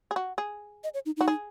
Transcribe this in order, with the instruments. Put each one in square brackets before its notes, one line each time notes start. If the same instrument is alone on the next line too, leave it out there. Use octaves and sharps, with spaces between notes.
[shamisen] G#4
F#4
G#4
[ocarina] D#5
C#5
D#4
[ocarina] D#4 [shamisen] F#4
[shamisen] G#4